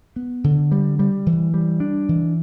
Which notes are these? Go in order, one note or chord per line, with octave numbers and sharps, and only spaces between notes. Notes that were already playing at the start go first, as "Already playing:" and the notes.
B3
D3
G3
G3
E3
G3
D4
E3